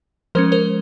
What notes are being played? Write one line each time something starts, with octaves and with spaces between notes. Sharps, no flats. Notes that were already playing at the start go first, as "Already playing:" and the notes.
F3 G#3 C#4 A#4 C5
A#4 C5